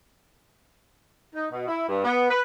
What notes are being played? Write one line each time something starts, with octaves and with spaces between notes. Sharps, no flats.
D#4
B2
E4
G2
B3
B4